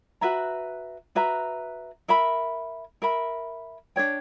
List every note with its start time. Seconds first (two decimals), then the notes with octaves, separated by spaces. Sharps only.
0.21 F#4 B4 E5 A#5
1.15 F#4 B4 E5 A#5
2.08 A#4 E5 B5
3.02 A#4 E5 B5
3.96 D4 A#4 C#5 G5